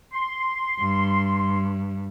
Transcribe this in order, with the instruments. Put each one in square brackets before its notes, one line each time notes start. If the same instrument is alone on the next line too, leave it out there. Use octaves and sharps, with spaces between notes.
[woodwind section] C6
[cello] G2